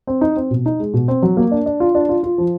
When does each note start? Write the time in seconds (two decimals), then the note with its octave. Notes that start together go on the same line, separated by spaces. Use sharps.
0.07 C4
0.21 D#4
0.36 C4
0.51 B2
0.66 D#4
0.80 G#3
0.94 B2
1.08 C4
1.22 F#3
1.37 A#3
1.51 D4
1.66 D4
1.80 F4
1.95 D4
2.09 F4
2.23 F4
2.38 F3